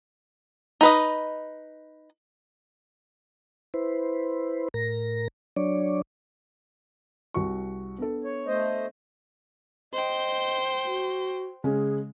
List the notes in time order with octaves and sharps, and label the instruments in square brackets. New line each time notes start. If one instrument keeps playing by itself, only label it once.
[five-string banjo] D#4 B4 D#5
[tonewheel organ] E4 B4 C5
A2 A#4 A#6
F#3 D4 C#5 D5
[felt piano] C2 F#4 C#6
B3 D4 A4
[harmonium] C#5
A3 C5 D#5
[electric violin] C5 G5 [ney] D#5
[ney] F#4
[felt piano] C#3 G#3 C#4 [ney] G#4